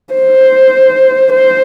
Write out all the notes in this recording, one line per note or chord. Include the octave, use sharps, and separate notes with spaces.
C5
C5